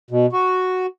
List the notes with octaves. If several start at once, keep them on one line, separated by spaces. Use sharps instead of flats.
B2
F#4